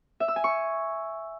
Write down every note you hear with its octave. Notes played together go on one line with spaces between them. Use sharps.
E5
E6
G#5
C#6